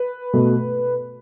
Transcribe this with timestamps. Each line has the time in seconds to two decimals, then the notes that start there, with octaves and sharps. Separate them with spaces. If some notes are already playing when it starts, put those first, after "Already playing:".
Already playing: B4
0.33 B2 A3